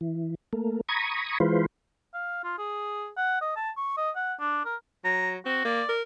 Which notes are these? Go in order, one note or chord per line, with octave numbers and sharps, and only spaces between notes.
E3
A3 A#3
A#5 B5 C#6 D#6 G#6
E3 G#3 F4 B4 C5
F5
F4
G#4
F#5
D#5
A5
C#6
D#5
F#5
D4
A#4
F#3 A#5
C4 F#4
A#3 D5
A#4